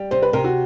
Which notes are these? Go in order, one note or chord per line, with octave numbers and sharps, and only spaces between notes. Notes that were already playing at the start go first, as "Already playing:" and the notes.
Already playing: G3
C3 C5
B4
C3 A#4
F#4